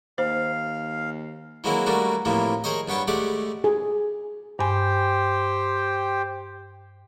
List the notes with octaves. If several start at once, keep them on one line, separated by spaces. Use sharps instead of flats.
D#2 C5 F5
E3 F#3 G#3 A#3 C4 E4
G3 A3 A#3 D4 F#4
A2 C3 E3 F3 A#3
G#4 A#4 C5 C#5 D#5
G2 B3 C#5 G5 A5
G#3 A3 G4 D5 F#5
G#4
G2 G4 C5 G5 G#5